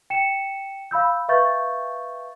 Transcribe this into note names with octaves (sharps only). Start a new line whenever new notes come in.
G5 C#7 E7
F5 B5 E6 G6
B4 E5 F5 C#6 G6 A6